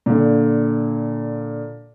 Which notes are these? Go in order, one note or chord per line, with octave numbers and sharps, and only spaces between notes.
A#2 D3